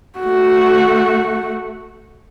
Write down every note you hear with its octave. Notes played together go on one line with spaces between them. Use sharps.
A3 F#4